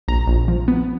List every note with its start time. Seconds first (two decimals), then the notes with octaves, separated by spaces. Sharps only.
0.08 A#1 A#5
0.28 A#1
0.48 F3
0.68 B3